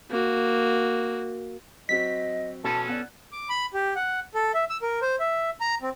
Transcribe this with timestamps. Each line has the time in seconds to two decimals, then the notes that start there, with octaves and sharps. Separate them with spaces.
0.10 A#3 F#4
1.89 F#3 C4 F#4 D#5 B6
2.64 B2 C#4 A4 A5 B5
2.87 B3 D5 F#5 F#6
3.32 D6
3.49 B5
3.74 G4
3.96 F#5
4.35 A4
4.54 E5
4.70 E6
4.82 A#4
5.02 C5
5.20 E5
5.61 A#5
5.82 C4